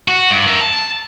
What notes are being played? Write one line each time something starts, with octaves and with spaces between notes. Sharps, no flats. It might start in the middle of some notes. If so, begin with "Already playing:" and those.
F#4
G2
A#4 E5
A5